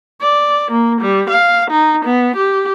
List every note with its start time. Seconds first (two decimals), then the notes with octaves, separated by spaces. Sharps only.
0.22 D5
0.71 A#3
1.01 G3
1.30 F5
1.71 D#4
2.06 B3
2.36 G4